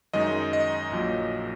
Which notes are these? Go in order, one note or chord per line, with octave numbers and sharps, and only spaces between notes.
F#2 D#3 G#3 D#5
D#5
A#1 A#2 F#3